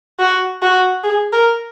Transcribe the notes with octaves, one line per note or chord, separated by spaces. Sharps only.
F#4
F#4
G#4
A#4